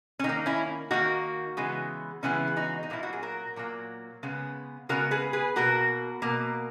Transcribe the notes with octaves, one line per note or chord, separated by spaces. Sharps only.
C#4
D#3 A#3 D#4
C#4 E4
D#3 A#3 D#4 F#4
C#3 E3 G#3 B3
C#3 E3 G#3 B3 C#4 E4
G#4
D#4 F#4
D#4
A#2 F#3 A#3 E4
F#4
G#4
F#4 A#4
A#2 F#3 A#3
C#3 G#3 B3
C#3 G#3 B3 F#4 A#4
G#4 B4
G#4 B4
B2 A#3 F#4 A#4
B2 A#3